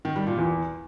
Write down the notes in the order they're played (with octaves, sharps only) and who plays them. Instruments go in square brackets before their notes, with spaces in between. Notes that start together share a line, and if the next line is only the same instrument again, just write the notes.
[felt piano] D#3
G3
A#2
E2